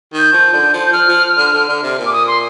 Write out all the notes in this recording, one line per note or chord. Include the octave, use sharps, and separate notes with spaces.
D#3 G6
F3
D3
F3
G6
F3 F6
F3
D3
D3
D3
C3
A#2
D6
D#6
C6